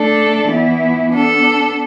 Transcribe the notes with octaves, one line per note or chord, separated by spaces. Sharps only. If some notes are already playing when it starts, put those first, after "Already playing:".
Already playing: A3 D4 A4 D5
E3 B3 E4
B3 D4 A4